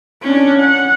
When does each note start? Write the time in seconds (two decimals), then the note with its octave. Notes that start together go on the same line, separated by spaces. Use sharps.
0.22 C#4 D4
0.58 F#5